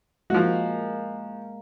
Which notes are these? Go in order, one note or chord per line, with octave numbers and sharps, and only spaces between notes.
F3 G#3 A#3 F#4